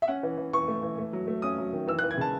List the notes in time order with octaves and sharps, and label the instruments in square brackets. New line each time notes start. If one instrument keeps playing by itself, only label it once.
[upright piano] E5
C#4 F#5
E3
E3
E3 C#6
A3
E3
A3
F#3
A3
C#4 D#6
F#3
D#3
E3 E6
F#6
E3
G#6
C#3 A5